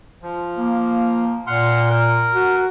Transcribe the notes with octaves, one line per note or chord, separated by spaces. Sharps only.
F3
A#3
A#2 F#5 C6 F6
A#4
F#4